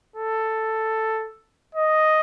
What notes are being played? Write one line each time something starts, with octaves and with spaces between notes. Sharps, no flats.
A4
D#5